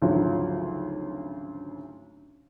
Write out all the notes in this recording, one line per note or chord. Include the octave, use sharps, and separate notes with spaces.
G#1 D2 C#3 F3 F#3